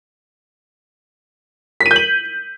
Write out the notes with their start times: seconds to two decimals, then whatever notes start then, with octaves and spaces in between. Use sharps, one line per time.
1.81 B6
1.86 D#7
1.91 G6
1.96 F#7